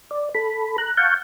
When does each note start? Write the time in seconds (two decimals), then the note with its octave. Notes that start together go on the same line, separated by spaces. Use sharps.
0.11 D5
0.35 A4 B5
0.78 A#5 F#6
0.97 F5 F#5 A5 C#6 G6